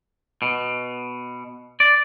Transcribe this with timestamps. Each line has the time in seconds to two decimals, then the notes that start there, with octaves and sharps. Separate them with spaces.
0.42 B2
1.80 D5